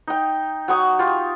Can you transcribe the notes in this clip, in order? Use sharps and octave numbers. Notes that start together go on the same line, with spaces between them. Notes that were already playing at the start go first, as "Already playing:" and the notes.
D#4 G5
F#3 C#6 D#6
F4 G4